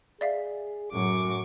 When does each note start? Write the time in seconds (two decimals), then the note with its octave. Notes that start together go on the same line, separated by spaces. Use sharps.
0.21 G#4 D5 E5 F5
0.92 F#2 A2 F#3 C#6 D6